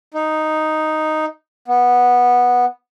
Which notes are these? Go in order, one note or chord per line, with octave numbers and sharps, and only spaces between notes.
D#4
B3